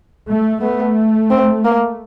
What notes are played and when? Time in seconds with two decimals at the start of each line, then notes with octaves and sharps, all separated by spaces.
0.27 A3
0.62 A3 B3
1.31 C4
1.65 A#3